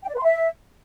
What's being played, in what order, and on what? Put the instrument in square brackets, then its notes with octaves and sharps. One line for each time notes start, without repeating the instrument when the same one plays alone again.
[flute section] G5
D5
B4
C6
E5